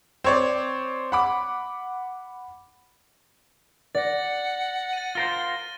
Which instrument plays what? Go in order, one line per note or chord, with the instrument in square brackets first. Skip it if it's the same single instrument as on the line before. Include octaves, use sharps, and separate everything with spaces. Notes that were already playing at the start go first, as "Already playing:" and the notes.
[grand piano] C4 C#5 D5
F#5 B5 D6
[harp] D5 [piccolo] F#5 [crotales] A6 A#6
[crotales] A6 D#7
[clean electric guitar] F4 A#4 C5 [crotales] G7